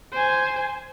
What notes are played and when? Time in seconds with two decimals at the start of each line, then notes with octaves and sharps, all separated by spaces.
0.12 C5 G#5